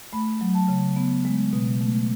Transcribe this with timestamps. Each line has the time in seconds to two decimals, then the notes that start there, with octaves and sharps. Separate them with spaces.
0.13 A3 B5
0.41 F#3
0.55 A5
0.68 C#3
0.96 B3
1.25 G#3
1.53 B2
1.81 A3